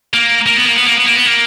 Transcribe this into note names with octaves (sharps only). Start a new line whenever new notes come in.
A#3
A#3
B3
A#3
B3
A#3
B3
A#3
B3
A#3